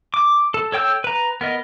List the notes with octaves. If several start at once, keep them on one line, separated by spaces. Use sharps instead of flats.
D6
A4
A4 C#5 G5 E6 G6
B4 A#5
B3 A#4 D#5